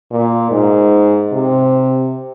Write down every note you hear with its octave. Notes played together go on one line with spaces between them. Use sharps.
A#2
G#2
C3